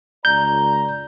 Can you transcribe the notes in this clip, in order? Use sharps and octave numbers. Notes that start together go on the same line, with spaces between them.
C#2 D5 A#5 G6